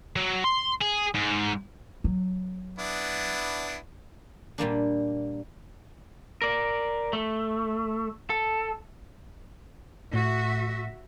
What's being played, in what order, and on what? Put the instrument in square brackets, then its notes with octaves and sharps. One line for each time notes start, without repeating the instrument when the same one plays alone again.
[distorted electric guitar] F#3
C6
G#4
G#2
[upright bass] F#3
[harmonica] B3 D4 E4
[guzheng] A#2 G3 A#3 D4
[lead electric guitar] A#4 D5
A3
A4
[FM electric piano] A2 [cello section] F#4 E5